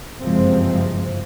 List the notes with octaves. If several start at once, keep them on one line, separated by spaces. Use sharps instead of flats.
F#1 G2 C3 F3 G#3 C4